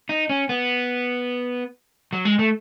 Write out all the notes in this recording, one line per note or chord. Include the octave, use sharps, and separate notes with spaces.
D#4
C#4
B3
F#3
G#3
A3